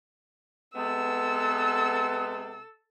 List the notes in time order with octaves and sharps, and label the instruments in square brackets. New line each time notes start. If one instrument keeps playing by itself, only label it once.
[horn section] C3 G#3 B3 [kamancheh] A4 E6